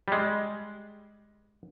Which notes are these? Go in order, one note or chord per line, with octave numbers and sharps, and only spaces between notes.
G3 G#3